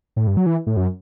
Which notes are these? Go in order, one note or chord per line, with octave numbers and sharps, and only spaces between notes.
A2
G2
F#3
E3
A2
F#2